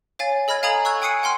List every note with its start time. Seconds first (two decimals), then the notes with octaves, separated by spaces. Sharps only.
0.19 C#5 F5 G#5 A6
0.48 A4 D#5 B5 F6 G#6
0.63 F5 G#5 A#5 D#6 G#6 F#7
0.85 C#6 E6 F#6 G#6
1.02 G5 G#5 D#6 C7 C#7 D#7
1.23 F#5 G5 C6 F6